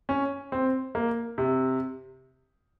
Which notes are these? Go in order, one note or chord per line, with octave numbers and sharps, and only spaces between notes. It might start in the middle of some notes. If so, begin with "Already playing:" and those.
C#4
C4
A#3
C3